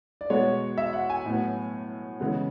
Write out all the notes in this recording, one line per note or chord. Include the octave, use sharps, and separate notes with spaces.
D5
B2 G#3 B3 C#5
E5
F#5
G#5
A2 F#3 B3
C#3 E3 G#3 B3